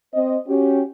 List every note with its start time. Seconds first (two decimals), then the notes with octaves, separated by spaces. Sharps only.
0.14 C4 C5 D#5
0.47 C#4 F#4 G4